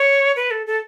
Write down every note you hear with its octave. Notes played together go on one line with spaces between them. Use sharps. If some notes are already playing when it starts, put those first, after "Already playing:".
Already playing: C#5
B4
A4
A4